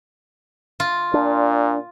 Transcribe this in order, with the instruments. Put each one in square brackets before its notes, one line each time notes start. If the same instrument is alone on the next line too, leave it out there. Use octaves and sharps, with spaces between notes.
[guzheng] F4
[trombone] A#2 [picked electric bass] D4